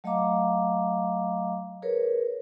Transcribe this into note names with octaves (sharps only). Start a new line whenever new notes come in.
F#3 A3 D#5 F5 A#5 D6
G#4 A#4 B4 C#5